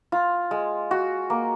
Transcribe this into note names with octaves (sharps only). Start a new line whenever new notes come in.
F4
G#3
F#4
A#3